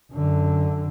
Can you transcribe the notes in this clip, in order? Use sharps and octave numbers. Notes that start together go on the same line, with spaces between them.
F#2 D3